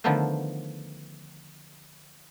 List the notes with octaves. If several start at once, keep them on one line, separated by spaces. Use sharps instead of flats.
D3 D#3 F3 A3 B3 C5